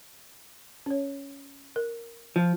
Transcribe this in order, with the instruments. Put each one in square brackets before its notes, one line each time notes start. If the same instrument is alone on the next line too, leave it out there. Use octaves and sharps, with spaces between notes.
[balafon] C#4 C#5
A#4
[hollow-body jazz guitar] F3